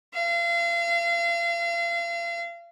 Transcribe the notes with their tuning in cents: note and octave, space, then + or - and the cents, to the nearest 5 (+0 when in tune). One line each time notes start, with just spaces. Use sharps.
F5 -35